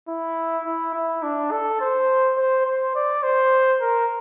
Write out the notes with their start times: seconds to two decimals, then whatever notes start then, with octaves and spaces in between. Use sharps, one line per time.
0.08 E4
0.66 E4
0.94 E4
1.23 D4
1.51 A4
1.81 C5
2.37 C5
2.66 C5
2.95 D5
3.23 C5
3.81 A#4